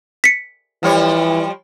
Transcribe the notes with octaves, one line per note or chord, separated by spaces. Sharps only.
B6 C#7
E3 F3 G3 C#5